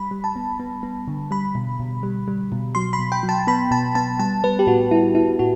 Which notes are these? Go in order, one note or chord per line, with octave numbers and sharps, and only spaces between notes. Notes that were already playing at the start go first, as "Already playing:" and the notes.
Already playing: G3 B5
G3
A5
B3
B3
B3
D3
G3 B5
B2
B2
G3
G3
B2
F#3 C6
B5
B2
G5
F#3
A5
B3 B5
B2 A5
B3 A5
G3 A5
G3 B4
G4
A2 F#4
G3 E4
B3 E4
A2 F#4